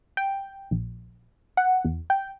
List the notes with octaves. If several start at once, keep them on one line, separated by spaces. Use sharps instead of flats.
G5
A#1
F#5
E2
G5